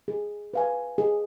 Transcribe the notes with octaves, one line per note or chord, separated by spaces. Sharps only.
G#4
B4 F5 G#5
G#4